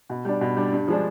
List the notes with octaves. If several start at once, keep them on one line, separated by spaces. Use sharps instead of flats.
B2
G3 D4
B2
G3 D4
G2
F3 G#3 D4